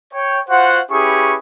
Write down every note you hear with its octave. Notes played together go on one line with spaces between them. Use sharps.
C#5 G5
F4 F#4 C5 F#5
C#4 E4 G4 G#4 B4 C#6